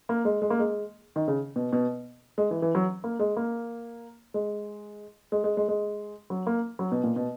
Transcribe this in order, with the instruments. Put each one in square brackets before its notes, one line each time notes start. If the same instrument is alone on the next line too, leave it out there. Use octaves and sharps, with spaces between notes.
[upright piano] A#3
G#3
G#3
A#3
G#3
D#3
C#3
B2
B2
G#3
E3
E3
F#3
A#3
G#3
A#3
G#3
G#3
G#3
G#3
G#3
F#3
A#3
F#3
B2
A#2
B2